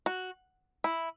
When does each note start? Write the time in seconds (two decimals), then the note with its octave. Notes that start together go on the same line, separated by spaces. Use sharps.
0.06 F#4
0.84 E4